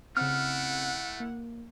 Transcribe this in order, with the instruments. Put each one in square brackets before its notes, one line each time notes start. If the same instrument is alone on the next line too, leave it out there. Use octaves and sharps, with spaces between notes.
[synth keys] C#3 C4 [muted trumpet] A3 [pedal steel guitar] E4 F6 [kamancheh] F#5
[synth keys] A#3